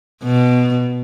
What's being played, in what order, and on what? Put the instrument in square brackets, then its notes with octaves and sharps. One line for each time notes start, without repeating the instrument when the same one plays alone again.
[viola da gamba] B2